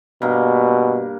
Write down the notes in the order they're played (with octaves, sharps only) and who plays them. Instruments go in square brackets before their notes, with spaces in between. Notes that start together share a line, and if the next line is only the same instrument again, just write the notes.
[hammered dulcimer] G2 A#3 [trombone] B2